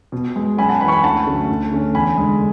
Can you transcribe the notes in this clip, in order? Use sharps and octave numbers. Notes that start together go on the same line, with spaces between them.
B2
G#3 B3
F#2 G#5 B5
F#5 A5
E3 B3 G#5 B5
C#6
G#5 B5
D2 F#5 A5
D3 F#3 A3 C#4
D2
D3 A3 C#4
E2 G#5 B5
D3 G#3